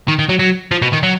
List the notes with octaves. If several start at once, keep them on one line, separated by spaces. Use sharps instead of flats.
D#3
D#3
F#3
F#3
F3
B2
D#3
F#3